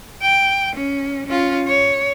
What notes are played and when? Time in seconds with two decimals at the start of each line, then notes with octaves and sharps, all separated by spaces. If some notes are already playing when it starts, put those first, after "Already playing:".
0.22 G5
0.76 C#4
1.27 C#4 F4
1.67 C#5